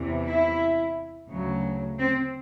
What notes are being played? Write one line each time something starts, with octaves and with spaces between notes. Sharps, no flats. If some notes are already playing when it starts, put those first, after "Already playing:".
Already playing: E2 C3 E3
E4
D2 C#3 F#3
C4